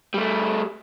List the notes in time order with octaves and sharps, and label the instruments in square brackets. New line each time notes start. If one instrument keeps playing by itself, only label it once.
[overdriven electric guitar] G3 A3